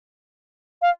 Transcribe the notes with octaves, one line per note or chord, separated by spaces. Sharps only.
F5